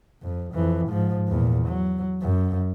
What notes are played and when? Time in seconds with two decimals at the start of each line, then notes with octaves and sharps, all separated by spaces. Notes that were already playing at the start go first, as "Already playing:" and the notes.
0.22 F2
0.53 F2 E3
0.88 G#2 F3
1.28 E2 A#2
1.68 F#3
2.21 F#2